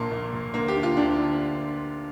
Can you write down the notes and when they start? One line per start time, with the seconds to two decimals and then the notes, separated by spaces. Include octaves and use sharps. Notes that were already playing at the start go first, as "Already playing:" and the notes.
Already playing: A#1 A#2 D3 A#3
0.11 A#1
0.32 A#2
0.54 D2 A#3
0.68 G4
0.76 D3
0.83 F4
0.97 D2 D4
1.18 D3